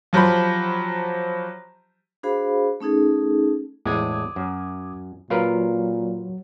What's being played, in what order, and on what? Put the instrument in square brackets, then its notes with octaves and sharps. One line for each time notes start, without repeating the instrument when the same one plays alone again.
[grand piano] F3 F#3 G4 C5 B5
[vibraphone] D4 F#4 G#4 C5 F5 B5
A3 C#4 D#4 G#4 A4
[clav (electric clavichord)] E2 A2 G#3 [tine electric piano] D6 D#6 G#6
[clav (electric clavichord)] F#2
[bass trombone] A#2 [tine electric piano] F#3 [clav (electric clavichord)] F4 A#4 B4